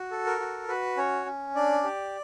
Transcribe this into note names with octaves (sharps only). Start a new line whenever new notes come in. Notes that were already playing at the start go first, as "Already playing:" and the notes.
Already playing: F#4
A4
A#4
F#4
F#4 B4
C#4 C#5
C#4
D4 D5
G4